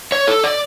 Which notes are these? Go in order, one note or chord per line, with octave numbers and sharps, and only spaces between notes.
C#5
A4
D5